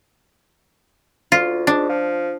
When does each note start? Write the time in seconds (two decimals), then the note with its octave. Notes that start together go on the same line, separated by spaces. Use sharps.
1.32 D2 F4
1.67 G#2 D4
1.89 F3